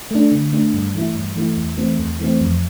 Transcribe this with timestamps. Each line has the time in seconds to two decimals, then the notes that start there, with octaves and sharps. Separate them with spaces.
0.11 A3 D4
0.32 D3
0.53 A3 D4
0.74 G2
0.95 E3 A3 E4
1.15 G2
1.36 E3 A3 E4
1.57 E2
1.77 E3 A3 C4
1.99 E2
2.20 E3 A3 C4
2.41 F2